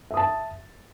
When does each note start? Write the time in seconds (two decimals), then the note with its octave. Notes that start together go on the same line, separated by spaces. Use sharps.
0.11 E5
0.14 D#6
0.17 A5